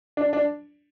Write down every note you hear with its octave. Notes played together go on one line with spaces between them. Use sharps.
D4
D4